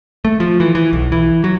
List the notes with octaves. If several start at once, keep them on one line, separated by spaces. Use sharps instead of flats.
A3
F3
E3
E3
B1
E3
F#3